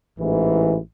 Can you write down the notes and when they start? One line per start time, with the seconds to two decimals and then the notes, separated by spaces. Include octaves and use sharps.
0.19 A1 G#2 E3